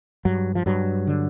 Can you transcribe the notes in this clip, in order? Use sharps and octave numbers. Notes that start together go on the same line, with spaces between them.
G2 F#3
F3
G2 F#3
D3